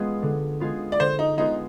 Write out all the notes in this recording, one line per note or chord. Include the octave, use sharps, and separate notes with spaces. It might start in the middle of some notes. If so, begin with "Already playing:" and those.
Already playing: G#3 B3 F4 G#4
D3
G#3 B3 F4 G#4
D5
D3 C5
D#4
G#3 B3 D#4 F4 G#4